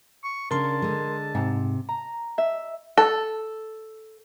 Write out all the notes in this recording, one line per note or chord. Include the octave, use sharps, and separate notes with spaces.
C#6
C#3 D4 A#4 A5 C6
D3 G#3
G#2 C3
A#5
E5
A4